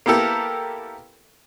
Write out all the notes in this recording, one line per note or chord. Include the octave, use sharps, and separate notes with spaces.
A#3 B3 E4 G4 A4 A#4